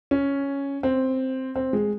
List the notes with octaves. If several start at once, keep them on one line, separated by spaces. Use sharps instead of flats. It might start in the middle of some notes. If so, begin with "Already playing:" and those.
C#4
C4
C4
G#3